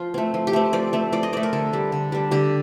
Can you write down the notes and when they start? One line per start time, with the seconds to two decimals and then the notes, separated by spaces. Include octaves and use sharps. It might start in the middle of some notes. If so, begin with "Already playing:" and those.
Already playing: F3 F4
0.14 A3 C4
0.34 F3
0.47 G4
0.53 A3 C4
0.73 F3 D5
0.93 A3 C4
1.12 F3 D5
1.23 D#5
1.33 A3 C4 D5
1.43 A#4
1.53 D3 A4
1.73 G3 D4
1.92 D3
2.12 G3 D4
2.31 D3 G4